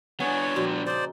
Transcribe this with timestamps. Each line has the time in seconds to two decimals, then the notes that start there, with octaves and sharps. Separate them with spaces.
0.20 B3 D4 G#4 C#5 F#5
0.56 A#2 F3 G3 F#4
0.86 C#3 D#4 C5 D5 A5